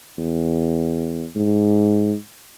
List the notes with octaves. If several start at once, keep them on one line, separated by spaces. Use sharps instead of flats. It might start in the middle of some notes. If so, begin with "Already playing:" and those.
E2
G#2